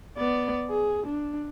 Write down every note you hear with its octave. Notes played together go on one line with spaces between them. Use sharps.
B3 D5
G#4
D4